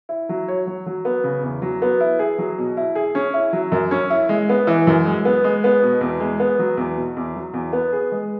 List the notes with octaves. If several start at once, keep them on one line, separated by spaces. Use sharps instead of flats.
E4
F#3
C#5
F#3
F#3
B3
C#3
E2
F#3
B3
E4
G#4
F#3
B2
E4
G#4
C#4
E4
F#3
F#2
C#4
E4
G#3
B3
E3
F#2
G#3
B3
G#3
B3
B2
E2
G#3
B3
F#3
E2
B2
E2
F#3
E2
B3
G#4
G#3